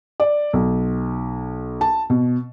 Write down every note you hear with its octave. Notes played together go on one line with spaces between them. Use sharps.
D5
B1
A5
B2